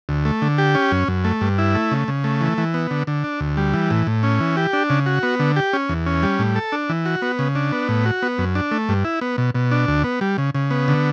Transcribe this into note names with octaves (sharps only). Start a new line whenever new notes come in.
D2
A3
D3
G4
C#4
F#2
F#2
A3
G2
E4
A3
C#3
C#3
A3
E3
E3
B3
D3
D3
D4
D2
G3
E3
A2
A2
C#4
E3
G4
D4
C#3
F#4
B3
D3
G4
C#4
E2
C#4
G3
A2
A4
D4
E3
F#4
B3
C#3
D4
B3
A2
F#4
B3
F#2
D4
A3
G2
E4
B3
B2
B2
D4
D2
B3
G3
C#3
C#3
B3
D3